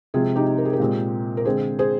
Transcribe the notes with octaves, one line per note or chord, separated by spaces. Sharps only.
C3 F3 G#3 C4 F4 G#4
D#4 G4
A#4
G#4
G4 A#4
A#2 G#3 C4
A#4
D3 G#3 C4 G#4 C5
G#4 C5